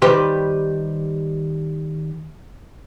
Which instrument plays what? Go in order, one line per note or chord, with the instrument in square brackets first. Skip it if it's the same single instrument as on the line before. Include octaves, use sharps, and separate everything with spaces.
[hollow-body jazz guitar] D#3 G3 G4 B4 C5